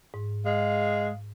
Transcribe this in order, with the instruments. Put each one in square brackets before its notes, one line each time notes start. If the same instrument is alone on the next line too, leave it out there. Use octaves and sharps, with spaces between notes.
[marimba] G#2
[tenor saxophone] G#3 [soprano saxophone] F5